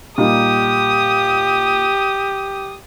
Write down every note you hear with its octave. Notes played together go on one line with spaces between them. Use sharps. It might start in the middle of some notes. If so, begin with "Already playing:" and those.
A#2 G3 D#4 G4 D#6